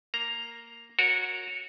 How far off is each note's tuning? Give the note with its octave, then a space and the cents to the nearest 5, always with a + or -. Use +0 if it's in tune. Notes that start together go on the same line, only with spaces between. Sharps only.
A#3 +0 A#5 +0
F#4 -15 A#4 +0 C#5 +0